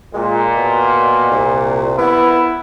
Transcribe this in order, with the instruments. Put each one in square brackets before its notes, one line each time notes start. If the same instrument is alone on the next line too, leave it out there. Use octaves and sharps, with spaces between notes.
[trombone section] A#2 [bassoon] G#3
[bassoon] B2
C2
[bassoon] B3 [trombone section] E4